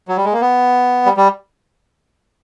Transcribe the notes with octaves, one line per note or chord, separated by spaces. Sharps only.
F#3
G3
G#3
A#3
B3
G3
G3